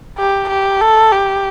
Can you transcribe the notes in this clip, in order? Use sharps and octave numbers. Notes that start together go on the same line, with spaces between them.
G4
G4
A4
G4